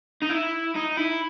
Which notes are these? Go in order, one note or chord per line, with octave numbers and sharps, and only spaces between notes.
D#4
E4
D#4
E4